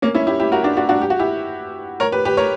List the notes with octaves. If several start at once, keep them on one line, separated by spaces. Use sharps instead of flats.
A#3 C#4
C#4 E4
E4 G4
E4 G4
F#4 A#4
D4 F#4
D4 F#4
D4 F#4
G4
F#4
E4 G4
A#4 C#5
G4 B4
G4 B4
A#4 C#5